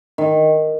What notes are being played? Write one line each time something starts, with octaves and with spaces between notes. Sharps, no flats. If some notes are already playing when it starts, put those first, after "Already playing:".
D#3